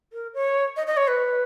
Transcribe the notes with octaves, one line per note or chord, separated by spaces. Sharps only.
A#4
C#5
D#5
D#5
C#5
B4